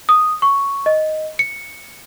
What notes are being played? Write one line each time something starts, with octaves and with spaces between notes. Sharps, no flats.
D#6
C#6
D#5
C#7